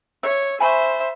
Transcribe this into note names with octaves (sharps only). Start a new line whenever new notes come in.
C#5 E5
C5 E5 G#5 B5 C#6